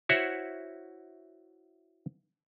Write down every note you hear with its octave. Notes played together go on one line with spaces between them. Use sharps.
E4 F#4 C5 C#5 E5 F#5